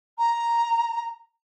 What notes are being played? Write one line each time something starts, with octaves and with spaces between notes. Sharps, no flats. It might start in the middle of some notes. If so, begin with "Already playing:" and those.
A#5